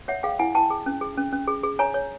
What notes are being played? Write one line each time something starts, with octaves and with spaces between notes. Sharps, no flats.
C#5 E5 F#5
G#4 F5 G5
E4 F#5 G#5
E4 G5 A5
G#4
C#4
G#4
C#4
C#4
G#4
G#4
C#5 G#5 A#5
C#5